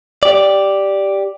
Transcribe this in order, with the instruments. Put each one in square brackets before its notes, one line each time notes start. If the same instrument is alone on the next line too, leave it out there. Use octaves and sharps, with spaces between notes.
[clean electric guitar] G4 D5